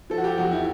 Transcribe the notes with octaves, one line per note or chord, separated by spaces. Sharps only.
F3 A4
F#4
G4
E2 F#4
E4